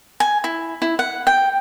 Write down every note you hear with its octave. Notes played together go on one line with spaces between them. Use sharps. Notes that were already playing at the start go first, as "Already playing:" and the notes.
G#5
E4
E4
F#5
G5